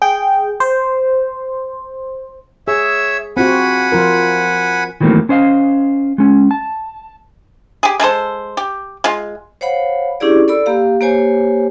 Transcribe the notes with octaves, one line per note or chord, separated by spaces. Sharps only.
G#4 G5
C5
G#4 C#5 E5 E6
C4 F4 F#4 F#5 G#5 B5
F3 F4 A#4
D#3 E3 F#3 A3 A#3 C4
C#4 C5 D#5 F5
G#3 C#4
A5
G4 G#4
G#3 A3 A4 C5
G4
G#3 F4
C5 C#5 F5 F#5 B5
C#4 D4 E4 G4 G#4 D5
A4 D5 B5 E6
A#3 G4 F5
A#3 G4 C5 C#5 G#5